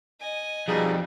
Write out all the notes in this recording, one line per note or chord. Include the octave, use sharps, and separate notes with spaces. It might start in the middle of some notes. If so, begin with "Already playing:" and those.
D#5 G#5
F2 B2 G3 D#4 G#4